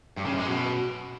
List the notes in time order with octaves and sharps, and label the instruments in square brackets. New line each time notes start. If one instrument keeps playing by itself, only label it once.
[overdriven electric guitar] G2
C#3
F#2
G#3
B2